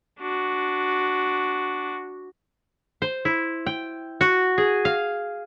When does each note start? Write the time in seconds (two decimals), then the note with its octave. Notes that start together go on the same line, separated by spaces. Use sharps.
0.19 D4 F#4
3.02 C5
3.25 E4
3.66 G5
4.21 F#4
4.58 G#4
4.85 F5